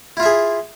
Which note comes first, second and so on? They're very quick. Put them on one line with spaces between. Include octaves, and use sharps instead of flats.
E4 F4 E5 G#4